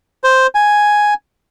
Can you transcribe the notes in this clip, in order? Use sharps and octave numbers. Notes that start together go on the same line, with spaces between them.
C5
G#5